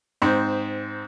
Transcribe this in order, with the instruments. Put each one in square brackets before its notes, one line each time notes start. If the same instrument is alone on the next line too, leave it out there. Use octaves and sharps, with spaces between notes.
[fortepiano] G#2 C4